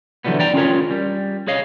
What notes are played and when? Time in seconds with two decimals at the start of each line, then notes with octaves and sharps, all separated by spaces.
0.25 D3 E3 F#3 G3 B3
0.40 D5 G5 A#5
0.54 C#4 F4 G#4 A#4 C#5
0.91 G3
1.48 G#4 C#5 D#5 F5